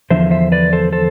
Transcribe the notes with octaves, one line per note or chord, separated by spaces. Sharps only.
E2 D3 F3 C5 E5
C5 E5
B4 D5
A4 C5
A4 C5